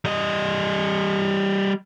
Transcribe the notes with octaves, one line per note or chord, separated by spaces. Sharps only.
G3 D#5